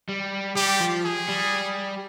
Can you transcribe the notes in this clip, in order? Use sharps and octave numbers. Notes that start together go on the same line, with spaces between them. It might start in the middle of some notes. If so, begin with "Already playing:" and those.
G3
G3 G4
F3
G#4
G3